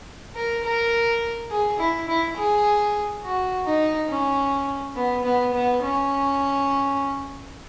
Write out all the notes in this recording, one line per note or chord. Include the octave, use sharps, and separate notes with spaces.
A#4
A#4
G#4
E4
E4
G#4
F#4
D#4
C#4
B3
B3
B3
C#4